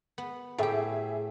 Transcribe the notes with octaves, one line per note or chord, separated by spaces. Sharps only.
B3
A2 G4 G#4 E5 G5